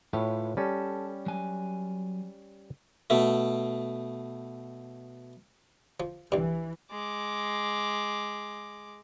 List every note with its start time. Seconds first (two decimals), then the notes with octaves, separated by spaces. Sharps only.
0.13 A2 F4 B4 C#5
0.57 G3 C#4 A4
1.26 F#3 G#5
3.10 B2 A3
6.00 F3
6.32 C2 G2 E3
6.91 G#3 D6